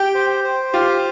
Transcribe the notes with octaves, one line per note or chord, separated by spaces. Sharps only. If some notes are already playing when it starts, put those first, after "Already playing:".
Already playing: G4 G5
C5
C5
F4 G4